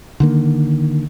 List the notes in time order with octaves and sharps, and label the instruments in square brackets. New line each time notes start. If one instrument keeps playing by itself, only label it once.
[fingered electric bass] D3 D#3 A#3